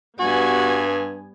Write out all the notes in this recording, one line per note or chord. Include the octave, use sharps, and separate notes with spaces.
G2 G3 B3 F#4 G#5